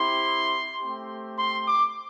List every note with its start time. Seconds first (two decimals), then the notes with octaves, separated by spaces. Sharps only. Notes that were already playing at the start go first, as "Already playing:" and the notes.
Already playing: C4 E4 G4 C6
0.80 A3 C4 G4
1.37 C6
1.66 D6